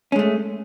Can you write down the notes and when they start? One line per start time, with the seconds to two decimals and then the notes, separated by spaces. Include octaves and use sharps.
0.12 C#4
0.16 G#3
0.19 A3